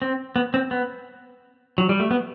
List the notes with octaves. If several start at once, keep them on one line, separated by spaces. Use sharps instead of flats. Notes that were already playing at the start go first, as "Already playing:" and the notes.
C4
B3
C4
B3
F#3
G3
A3
B3